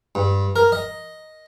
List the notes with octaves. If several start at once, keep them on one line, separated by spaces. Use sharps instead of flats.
G2
A#4
D#5